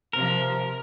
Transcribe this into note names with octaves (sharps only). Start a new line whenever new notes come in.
C3 F3 A#4